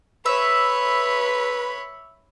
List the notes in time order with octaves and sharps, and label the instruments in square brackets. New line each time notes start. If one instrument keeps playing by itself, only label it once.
[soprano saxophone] B4 [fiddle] C#5 B5 [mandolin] E5